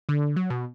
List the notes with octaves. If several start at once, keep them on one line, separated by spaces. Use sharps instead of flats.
D3
F#3
B2